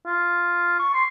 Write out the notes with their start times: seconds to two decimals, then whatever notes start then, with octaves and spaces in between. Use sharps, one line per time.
0.06 F4
0.79 C#6
0.94 C6